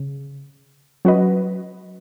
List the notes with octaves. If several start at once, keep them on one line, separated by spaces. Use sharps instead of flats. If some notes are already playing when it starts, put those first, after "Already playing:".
Already playing: C#3
F#3 C#4 F#4 B4 D#5